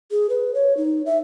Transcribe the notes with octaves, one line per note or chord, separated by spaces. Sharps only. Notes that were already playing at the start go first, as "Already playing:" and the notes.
G#4
B4
C#5
D#4
E5